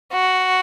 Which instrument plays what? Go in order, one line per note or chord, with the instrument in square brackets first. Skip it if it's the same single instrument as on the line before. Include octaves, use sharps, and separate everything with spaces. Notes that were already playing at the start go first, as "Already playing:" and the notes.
[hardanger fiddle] F#4